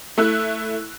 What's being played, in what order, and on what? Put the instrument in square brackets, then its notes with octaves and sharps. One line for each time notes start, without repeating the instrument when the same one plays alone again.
[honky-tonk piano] A3 E4 E6 F#6